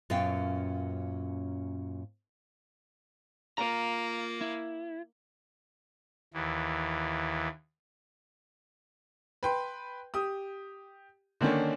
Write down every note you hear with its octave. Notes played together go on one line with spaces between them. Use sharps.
F#2 A#2 B3 C#4 F5 G5
A#3 F4 A#5
E4
D#2 E3
B4 G5 C6
G4 D#6
D3 D#3 A#3 C#4 D4